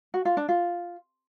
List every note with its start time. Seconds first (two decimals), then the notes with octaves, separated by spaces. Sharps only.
0.14 F#4
0.25 F4
0.37 D4
0.48 F4